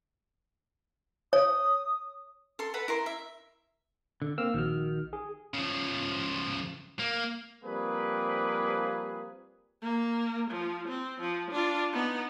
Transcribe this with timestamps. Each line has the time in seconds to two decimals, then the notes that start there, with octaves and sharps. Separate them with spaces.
1.33 C#5 D#6
2.59 A4 C6
2.74 A4 B4 F#5 B5
2.88 E4 A#4 C6
3.06 E5
4.22 D3
4.38 A#3 C4 E6 F6
4.54 A#1 D#3 F#4 F6
5.13 G#4
5.54 C#3 F3
6.99 A#3
7.64 F3 G3 A#3 C4 G#4 B4
9.82 A#3
10.50 F3
10.88 C4
11.20 F3
11.51 D4 F4
11.93 B3 D#4